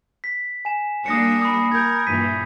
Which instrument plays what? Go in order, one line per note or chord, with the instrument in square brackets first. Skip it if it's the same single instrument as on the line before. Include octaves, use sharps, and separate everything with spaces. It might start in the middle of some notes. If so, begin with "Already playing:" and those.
[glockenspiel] B6
G#5 E7
[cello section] G3 A#3 D4 [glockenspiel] D#6 A#6 C#7
[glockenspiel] B5 D#6
[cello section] A#4 [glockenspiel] G6 G#6
[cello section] G2 A#2 E3 [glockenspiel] B6 D#7